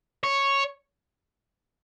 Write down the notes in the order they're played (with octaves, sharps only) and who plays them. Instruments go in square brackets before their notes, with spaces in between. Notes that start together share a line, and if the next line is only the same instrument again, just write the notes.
[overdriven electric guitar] C#5